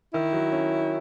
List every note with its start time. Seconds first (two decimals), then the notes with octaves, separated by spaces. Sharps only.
0.14 D#3 E4
0.33 F#3
0.52 C#4